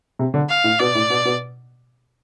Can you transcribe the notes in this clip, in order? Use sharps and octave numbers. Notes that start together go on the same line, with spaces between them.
C3
D3
F5
A2
B2 D5
A2
B2
B2